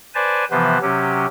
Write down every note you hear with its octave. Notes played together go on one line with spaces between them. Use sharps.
B4 C5 D5 G#5 A5
C3 E3 F3 B3 B4 C5
C3 F#3 C#4 G4